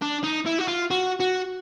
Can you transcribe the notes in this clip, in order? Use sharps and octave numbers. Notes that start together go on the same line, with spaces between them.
D4
D#4
E4
F#4
F4
F#4
F#4